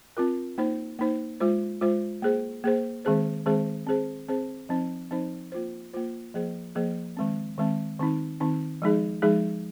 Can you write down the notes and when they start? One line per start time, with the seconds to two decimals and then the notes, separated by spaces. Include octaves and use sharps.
0.17 C4 F4 A#4
0.58 A#3 D#4 C5
0.99 A#3 D#4 C5
1.40 G#3 F4 C5
1.81 G#3 F4 C5
2.22 A#3 G#4 C5
2.64 A#3 G#4 C5
3.05 D#3 G#3 C4 G#4 C5
3.46 D#3 G#3 C4 G#4 C5
3.87 C4 G#4 C5
4.29 C4 G#4 C5
4.69 F3 C4 D#4 C5
5.11 F3 C4 D#4 C5
5.52 A#3 F4 C5
5.93 A#3 F4 C5
6.34 F3 A#3 G#4 C5
6.75 F3 A#3 G#4 C5
7.17 D#3 G#3 C4
7.58 D#3 G#3 C4
7.99 D#3 C4 D#4
8.40 D#3 C4 D#4
8.82 F3 G#3 D#4 G#4
9.22 F3 G#3 D#4 G#4